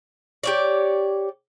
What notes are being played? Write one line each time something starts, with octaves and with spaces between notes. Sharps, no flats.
G4 C#5 D5